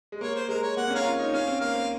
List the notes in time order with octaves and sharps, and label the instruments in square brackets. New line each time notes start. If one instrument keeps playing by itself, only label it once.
[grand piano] G#3
[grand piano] A#3 [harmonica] C#5
[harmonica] C5
[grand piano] G#3 [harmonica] A#4
[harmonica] C#5
[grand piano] A#3 [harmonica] F#5
[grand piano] C4
[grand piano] C#4 [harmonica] A#4 C#5 F5
[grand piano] F4
[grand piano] D#4 [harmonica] C#5
[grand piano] C#4 [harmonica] F5
[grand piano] C4
[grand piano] A#3 [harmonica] F5
[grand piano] C4